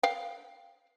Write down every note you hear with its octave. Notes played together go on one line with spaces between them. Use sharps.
F5 G5